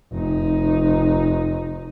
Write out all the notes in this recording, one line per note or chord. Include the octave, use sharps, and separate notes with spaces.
F1 D#4